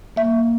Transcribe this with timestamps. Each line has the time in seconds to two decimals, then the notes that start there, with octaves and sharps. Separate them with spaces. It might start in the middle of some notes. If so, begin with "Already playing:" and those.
0.16 A#3 E5